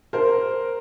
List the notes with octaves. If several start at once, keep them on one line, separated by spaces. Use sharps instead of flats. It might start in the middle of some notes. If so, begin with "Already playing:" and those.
A#4 C5